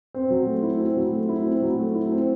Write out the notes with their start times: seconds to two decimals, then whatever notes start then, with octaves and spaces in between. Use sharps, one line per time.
0.15 C4
0.30 F#3
0.47 A3
0.63 E4
0.80 C4
0.97 F#3
1.13 A3
1.29 E4
1.46 C4
1.62 F#3
1.79 A3
1.95 E4
2.12 C4